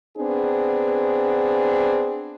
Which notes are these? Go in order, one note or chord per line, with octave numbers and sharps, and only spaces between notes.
B3 C4 D4 G#4